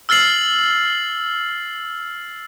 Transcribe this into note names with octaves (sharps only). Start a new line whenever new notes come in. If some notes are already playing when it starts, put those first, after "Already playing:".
E6 F6 A6 C7 F#7